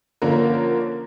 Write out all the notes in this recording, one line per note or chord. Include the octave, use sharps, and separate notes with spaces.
D3 F3 A#3 C#4 A#4